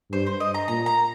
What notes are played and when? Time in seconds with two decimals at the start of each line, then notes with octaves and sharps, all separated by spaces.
0.12 G2 C5
0.26 C5
0.40 D#5
0.54 A#5
0.68 A#2 A#5
0.86 A#5